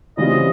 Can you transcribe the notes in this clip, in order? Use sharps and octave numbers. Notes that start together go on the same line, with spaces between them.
C#3 E3 G3 C4 F4 D#5